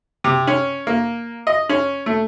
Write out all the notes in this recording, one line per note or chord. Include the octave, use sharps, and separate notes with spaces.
C3
C#4
A#3
D#5
C#4
A3